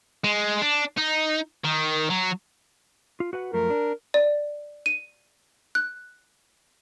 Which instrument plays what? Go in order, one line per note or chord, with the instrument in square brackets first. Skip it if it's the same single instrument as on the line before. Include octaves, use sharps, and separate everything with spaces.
[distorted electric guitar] G#3
D4
D#4
D#3
F#3
[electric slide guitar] F4
F#4 B4 F#5
[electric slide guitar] F#2 F3 A3 [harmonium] A#4
[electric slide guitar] D4
[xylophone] D5
D#7
F#6